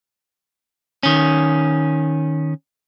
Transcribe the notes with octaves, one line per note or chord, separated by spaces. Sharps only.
D#3 C#4